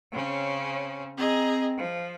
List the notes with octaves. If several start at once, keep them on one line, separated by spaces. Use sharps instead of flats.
C#3 C4 C#4
C4 G#4 D#5 A#5
F3